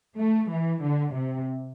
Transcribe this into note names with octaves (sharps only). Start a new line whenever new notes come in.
A3
E3
D3
C3